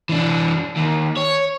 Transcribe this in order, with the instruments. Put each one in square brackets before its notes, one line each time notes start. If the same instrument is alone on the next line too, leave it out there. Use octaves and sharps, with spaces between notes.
[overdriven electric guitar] E3 D4
D#2
C#5